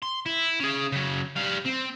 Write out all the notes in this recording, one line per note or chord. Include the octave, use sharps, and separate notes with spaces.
C6
E4
C#4 G#4
C#3 F#3
G3 F5
C4